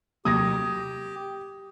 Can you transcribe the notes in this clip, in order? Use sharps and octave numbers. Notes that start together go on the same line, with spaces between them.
C3 F#3 A#3 G4 D#6 G#6 A#6